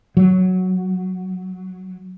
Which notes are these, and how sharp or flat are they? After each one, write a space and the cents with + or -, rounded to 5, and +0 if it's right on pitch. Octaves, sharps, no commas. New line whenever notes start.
F#3 +0